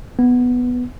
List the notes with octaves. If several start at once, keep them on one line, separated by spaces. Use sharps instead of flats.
B3